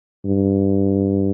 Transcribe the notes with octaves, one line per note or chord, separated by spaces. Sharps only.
G2